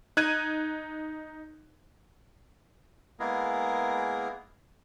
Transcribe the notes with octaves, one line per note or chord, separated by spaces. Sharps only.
D#4 F#6 G#6 D#7
G#3 A#3 B3 E4 G#4 A#4